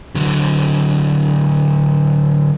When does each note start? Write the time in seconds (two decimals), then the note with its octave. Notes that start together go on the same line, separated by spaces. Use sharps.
0.15 D3 F#3